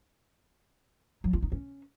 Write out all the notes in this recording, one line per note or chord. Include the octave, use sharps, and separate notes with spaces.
F#3
F4
D#4
C#4